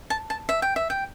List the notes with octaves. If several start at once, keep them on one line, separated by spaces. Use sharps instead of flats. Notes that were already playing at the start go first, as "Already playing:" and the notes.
A5
A5
E5
G5
E5
G5